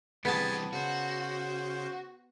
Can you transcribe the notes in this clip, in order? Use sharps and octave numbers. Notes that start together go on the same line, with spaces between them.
E3 G3 B3 C4 G#4 G#5 A5 C#7
C#3 F#4 C5